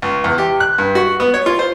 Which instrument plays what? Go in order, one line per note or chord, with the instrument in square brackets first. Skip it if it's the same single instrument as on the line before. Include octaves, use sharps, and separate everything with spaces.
[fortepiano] C#2
E2
G4
F#6
G2
F#4
B3
C#5
F4
C5